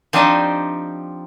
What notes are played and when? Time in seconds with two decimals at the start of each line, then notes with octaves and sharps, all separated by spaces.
0.13 F3 C4 D4 D#4 G4 D#5